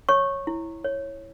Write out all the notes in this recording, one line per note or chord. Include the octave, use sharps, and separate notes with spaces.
C#5 C#6
E4
C#5